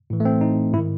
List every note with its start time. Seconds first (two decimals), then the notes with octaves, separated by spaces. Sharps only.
0.10 A2 E3
0.20 A3
0.25 C4
0.41 D#4
0.73 G#2 E4
0.78 D#3